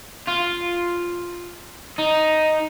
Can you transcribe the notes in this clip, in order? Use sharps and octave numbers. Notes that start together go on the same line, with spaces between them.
F4
D#4